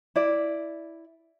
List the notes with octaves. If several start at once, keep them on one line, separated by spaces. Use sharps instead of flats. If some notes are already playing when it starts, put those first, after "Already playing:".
E4 D5